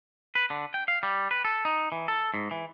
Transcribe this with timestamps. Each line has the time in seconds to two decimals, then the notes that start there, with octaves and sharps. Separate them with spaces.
0.35 B4
0.50 D3
0.74 G5
0.88 F5
1.03 G3
1.31 B4
1.45 A4
1.65 D#4
1.92 E3
2.08 A4
2.34 G#2
2.51 E3